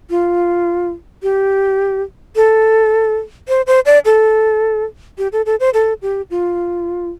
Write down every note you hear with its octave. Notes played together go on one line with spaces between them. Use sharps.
F4
G4
A4
C5
C5
D5
A4
G4
A4
A4
C5
A4
G4
F4